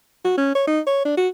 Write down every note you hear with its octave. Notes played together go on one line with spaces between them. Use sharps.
F#4
C#4
C#5
D#4
C#5
D4
F#4